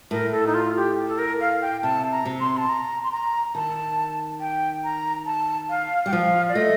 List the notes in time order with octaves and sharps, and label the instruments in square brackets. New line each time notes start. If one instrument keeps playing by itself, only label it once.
[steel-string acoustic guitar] A2 [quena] A#4
[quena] A4
D#4
F4
G4
A4
A#4
F5
G5
[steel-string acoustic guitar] C3 [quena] A5
[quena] A#5
[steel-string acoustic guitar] C3
[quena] C6
A5
A#5
C6
A#5
[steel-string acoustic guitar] D#3 [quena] A5
[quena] G5
A#5
A5
F5
[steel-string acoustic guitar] G3 [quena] G5
[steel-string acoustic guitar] F3 [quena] F5
[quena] D5
[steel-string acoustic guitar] A3 [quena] D#5